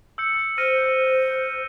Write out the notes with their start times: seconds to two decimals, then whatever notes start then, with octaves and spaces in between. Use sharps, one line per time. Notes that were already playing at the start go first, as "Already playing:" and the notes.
0.18 E6 G6 C#7
0.58 C5 F6 A#6 D#7